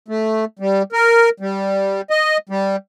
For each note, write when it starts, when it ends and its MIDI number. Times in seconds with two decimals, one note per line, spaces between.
0.08 0.45 57
0.59 0.83 55
0.92 1.29 70
1.40 2.01 55
2.10 2.37 75
2.49 2.76 55